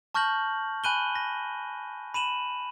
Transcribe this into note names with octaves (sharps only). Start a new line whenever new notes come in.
A5 C#6 F6 G6 A#6 F#7
G#5 B5 F#6 D#7 F#7 G7
A#6
B5 D#7 E7 F#7